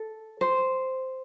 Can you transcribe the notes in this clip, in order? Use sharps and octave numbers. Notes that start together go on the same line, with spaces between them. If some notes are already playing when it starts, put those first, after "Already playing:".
Already playing: A4
C5